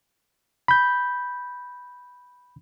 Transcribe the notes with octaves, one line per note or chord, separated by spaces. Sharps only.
B5 G6